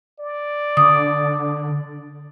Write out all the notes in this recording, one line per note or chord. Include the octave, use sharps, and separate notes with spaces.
D5
D3 D6 D#6